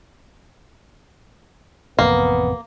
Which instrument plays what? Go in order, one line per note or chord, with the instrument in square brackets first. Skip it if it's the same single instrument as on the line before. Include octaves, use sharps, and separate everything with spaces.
[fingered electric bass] A1 F2 C3 [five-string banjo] A#3 [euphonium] B3